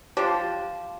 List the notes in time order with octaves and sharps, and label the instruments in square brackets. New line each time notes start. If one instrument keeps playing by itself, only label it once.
[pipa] F3 D4 G4 C5